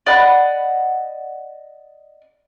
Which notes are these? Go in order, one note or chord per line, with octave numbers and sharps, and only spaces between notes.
D5 D#5 F#5 B5